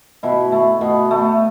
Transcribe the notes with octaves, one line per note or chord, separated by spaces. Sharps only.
B2 E4
A3
B2 B3
A3